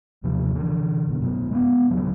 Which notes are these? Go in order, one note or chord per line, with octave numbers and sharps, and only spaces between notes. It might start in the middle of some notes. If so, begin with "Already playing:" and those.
D#2 C3 F3
D3 E3
F#1 B2
F#2 B2
G#3 A3 B3
D2 C#3 F#3 G3